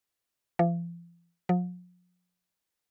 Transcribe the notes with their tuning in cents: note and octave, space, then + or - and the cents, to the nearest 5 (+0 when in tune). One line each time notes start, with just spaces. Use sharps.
F3 -40
F3 +45